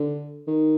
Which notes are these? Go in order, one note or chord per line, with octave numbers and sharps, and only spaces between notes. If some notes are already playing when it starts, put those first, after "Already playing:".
Already playing: D3
D#3